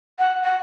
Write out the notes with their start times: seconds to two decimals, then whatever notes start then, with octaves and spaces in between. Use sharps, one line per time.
0.19 F#5
0.44 F#5